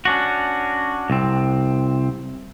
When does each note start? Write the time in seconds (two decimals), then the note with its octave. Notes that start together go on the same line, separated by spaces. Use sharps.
0.05 C#4 D4 F#4
1.10 C2 C4